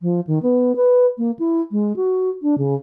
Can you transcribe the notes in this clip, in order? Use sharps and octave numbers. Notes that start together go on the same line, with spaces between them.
F3
D#3
B3
B4
A#3
E4
G#3
F#4
D4
C#3